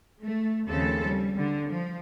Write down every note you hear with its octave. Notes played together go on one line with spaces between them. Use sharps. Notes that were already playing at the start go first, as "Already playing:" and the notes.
A3
D#2 C#3 F3 A3 C4 A4
G3
D3
F3